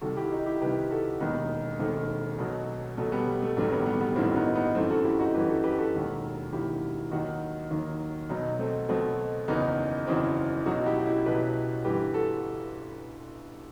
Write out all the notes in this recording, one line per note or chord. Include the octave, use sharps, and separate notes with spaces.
C2 C3 D#3 F#4 A4
E4 G4
D#4 F#4
E4 G4
C2 C3 D#3 G4 B4
F#4 A4
E1 D#2 D#3 B3 D#4
E1 D#2 D#3 A3 C4
B1 B2 F#3
B1 B2 F#3 A3
G3 B3
G3
A3
A1 G2 D#3 F#3 A3
G3 B3
G3 B3
G3 B3
A1 G2 D#3 F#3 C4 E4
B3 D#4
B3 D#4
G1 F#2 E3 A3 C4
F#4 A4
E4 G4
D#4 F#4
G1 F#2 E3 G4 B4
F#4 A4
G4 B4
F#4 A4
E1 D#2 D#3 F#3
E1 D#2 D#3 F#3 E4 G4
D#2 D#3 F#3 D#4 F#4
D#2 D#3 F#3
B1 B2 F#3 B3 D#4
A3 C4
B1 B2 F#3 A3 C4
F#1 E2 D#3 F#3 B3 D#4
F#1 E2 D#3 F#3 C4 E4
B1 B2 F#3 D#4 F#4
E4 G4
E4 G4
B1 B2 F#3 G4 B4
G1 G2 E3 G4 B4
F#4 A4